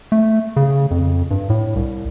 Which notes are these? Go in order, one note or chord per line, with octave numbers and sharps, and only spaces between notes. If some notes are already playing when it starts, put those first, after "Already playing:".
A3
C#3
F2
G2
A2
C2